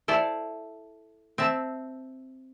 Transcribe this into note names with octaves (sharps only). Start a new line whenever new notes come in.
E4 A4 C5 D5
C4 E5 A5